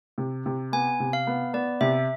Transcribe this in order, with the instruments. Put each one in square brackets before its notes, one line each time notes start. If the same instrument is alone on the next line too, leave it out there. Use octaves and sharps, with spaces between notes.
[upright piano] C3
C3
[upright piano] B3 [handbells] G#5
[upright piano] C3
[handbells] F5
[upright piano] B3
[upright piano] B3 [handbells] D5
[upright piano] C3 [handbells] E5